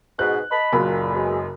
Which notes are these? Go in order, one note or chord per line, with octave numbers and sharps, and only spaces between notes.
G#2 B2 F#6
D#5 A5 B5
F#1 F#2 A#2 B5
B2 F#3 G#3